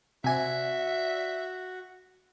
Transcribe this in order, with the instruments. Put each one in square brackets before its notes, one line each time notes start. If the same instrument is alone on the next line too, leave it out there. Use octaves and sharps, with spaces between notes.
[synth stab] C3 G#5 [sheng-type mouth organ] F#4 [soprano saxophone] E5